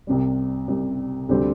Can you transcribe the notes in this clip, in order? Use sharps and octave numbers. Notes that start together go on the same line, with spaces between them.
C2 C3 G3
C2 C3 G3
D2 D3 G3 C4 G4